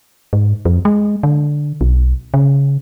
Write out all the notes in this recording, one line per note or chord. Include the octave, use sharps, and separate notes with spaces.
G#2
F2
G#3
D3
B1
C#3